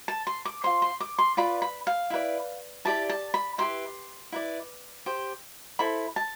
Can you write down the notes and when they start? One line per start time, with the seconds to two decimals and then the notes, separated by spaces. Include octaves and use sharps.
0.08 A5
0.27 C6
0.45 D6
0.64 F4 C5 C6
0.82 C6
1.00 D6
1.19 C6
1.37 F4 B4 D5 B5
1.62 B5
1.87 F5
2.10 E4 B4 D5
2.85 E4 G4 D5 A5
3.09 A5
3.34 B5
3.58 E4 G4 B4 C6
4.32 E4 B4 D5
5.06 G4 C5
5.79 E4 A4 C5 B5
6.16 A5